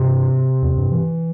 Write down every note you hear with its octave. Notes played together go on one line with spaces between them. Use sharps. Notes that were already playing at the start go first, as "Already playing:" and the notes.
Already playing: G2 C3
E2
G2
E3